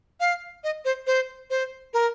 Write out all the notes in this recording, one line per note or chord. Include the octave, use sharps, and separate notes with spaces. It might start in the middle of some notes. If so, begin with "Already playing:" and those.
F5
D#5
C5
C5
C5
A#4